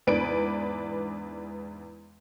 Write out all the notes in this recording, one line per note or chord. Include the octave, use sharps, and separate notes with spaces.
E2 G#2 D4 B4 D5 D7